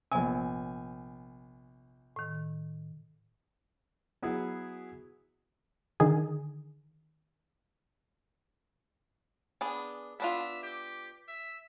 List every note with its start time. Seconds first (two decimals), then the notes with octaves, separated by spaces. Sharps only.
0.12 A#1 C3 B3 G#5
2.16 A2 D#3
4.22 F#3 B3 E4 G#4
6.00 D3 D#3 G#4
9.61 B3 D4 G#4
10.20 B3 D4 F4 E5
10.63 G4
11.28 E5